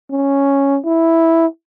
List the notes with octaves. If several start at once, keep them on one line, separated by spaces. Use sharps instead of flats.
C#4
E4